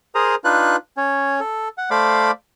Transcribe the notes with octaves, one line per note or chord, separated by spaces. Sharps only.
G#4 A#4 C5 A#5 D#6
D4 D#4 F4 B4 F#6
C#4 C#5
A4
F#5
A3 C5 D5 F5 B5 D6